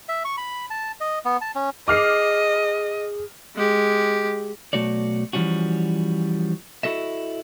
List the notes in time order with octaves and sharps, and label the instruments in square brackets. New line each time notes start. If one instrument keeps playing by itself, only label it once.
[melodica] E5
C#6
B5
A5
D#5
B3
A5
C#4
[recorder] G#4 [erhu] D#5 [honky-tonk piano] D6 F6 C7
[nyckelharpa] G#3 G4
[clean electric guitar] B1 E2 A3 F#4 C#5 D5
E3 F3 G3 C#4 F#4
E4 F#4 A4 D#5 E5